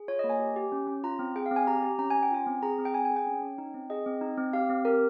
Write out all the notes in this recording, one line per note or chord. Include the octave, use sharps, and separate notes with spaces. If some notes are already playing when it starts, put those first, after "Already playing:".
Already playing: G#4
F4 C#5
D#5
A#3
G#5
G4
G4
C#4
C#4
F4 A#5
C4
G#4 G5
F5
C4
G#5
G4 A#5
G4
C#4 A#5
C#4 G#5
G5
F4 G#5
C4
G#4 A#5
C4
G5
G#4 G#5
G#5
G#4
G5
C#4
C#4
D#4
C4
G#4 D#5
C4
D#4
C4
G4 F5
C4
G4 A#4